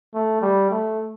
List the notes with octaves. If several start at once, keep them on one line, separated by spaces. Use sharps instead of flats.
A3
G3
A3